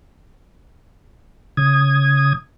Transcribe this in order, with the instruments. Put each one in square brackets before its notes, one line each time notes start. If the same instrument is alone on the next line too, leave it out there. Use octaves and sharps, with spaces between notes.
[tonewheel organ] C#3 D#6 G#6